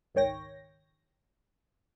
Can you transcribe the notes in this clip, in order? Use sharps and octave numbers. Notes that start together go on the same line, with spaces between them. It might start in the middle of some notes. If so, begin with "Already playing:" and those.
G#1 C#2 D#3 C#5 G5 A#6